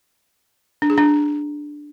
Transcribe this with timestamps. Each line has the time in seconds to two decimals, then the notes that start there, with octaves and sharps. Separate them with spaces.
0.82 D4
0.90 G#4
0.97 D4